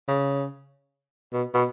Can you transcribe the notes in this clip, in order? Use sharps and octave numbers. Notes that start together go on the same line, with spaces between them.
C#3
B2
B2